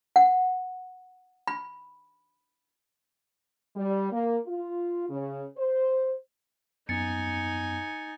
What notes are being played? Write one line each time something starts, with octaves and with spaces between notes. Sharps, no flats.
F#5
B5
G3
A#3
F4
C#3
C5
F#2 B3 D#4 G#5 A6 C#7